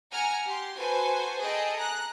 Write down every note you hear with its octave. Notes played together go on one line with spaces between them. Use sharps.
F#5 G#5 A#5 F6
G4 C6
F#4 A4 B4 C5 G#5
G#4 A4 D#5 G5
A#5 F#6